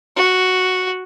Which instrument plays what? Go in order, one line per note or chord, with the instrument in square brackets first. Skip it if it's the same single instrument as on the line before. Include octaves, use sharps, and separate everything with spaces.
[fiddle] F#4